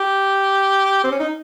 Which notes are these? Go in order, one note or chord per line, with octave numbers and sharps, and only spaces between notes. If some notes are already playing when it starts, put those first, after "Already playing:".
Already playing: G4
C4
C#4
D#4